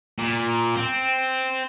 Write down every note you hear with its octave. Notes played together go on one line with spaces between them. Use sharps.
A#2
C4